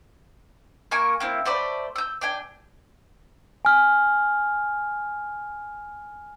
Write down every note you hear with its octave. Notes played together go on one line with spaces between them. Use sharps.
A#3 A#4 G#5 C#6
A#3 C4 E4
A3 C5 D5 B5
E6 G6
D4 G5 G#5
G#5 F6